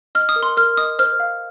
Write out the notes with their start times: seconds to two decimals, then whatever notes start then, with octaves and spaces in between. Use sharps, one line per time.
0.15 D#5 F6
0.29 D#6
0.36 A#4
0.43 C6
0.57 A#4 F6
0.77 D#5 D#6
0.99 C5 F6
1.20 F5